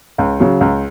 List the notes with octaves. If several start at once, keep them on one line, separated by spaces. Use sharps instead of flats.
C#2
C#3 F#3
C#2